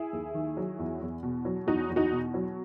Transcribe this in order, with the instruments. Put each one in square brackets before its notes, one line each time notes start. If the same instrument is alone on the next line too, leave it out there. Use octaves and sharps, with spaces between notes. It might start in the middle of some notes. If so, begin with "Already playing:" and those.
Already playing: [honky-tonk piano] E4 G#4
D#2
D#3
F#3
E2
E2
B2
F#3
E2 D#4 F#4
E2
D#4 F#4
B2
F#3